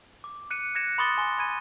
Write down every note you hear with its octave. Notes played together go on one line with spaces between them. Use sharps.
D6
F#6 C#7 D#7
F#6 G#6 A#6 C#7 E7
B5 C6 D6 D#6 A6 G7
G#5 C6 G7
B5 G#6 D#7